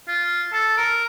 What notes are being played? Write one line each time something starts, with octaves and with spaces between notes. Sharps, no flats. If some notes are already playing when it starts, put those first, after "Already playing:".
F4
A4
A#4